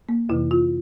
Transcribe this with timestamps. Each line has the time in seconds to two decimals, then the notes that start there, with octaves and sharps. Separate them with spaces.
0.09 A#3
0.29 F2 C3 E3 E4
0.51 F4